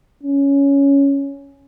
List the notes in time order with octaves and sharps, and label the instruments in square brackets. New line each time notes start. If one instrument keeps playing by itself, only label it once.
[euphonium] C#4